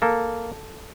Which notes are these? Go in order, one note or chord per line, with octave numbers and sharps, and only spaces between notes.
A#3 A4